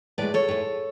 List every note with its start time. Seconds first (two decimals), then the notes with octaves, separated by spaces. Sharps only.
0.18 A2 G#3 B4 D5
0.34 A4 C#5
0.49 A2 G#3